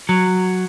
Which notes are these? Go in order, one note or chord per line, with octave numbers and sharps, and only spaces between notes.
F#3